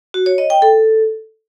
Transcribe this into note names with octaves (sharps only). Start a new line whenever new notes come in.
F#4
C#5
D#5
G5
A4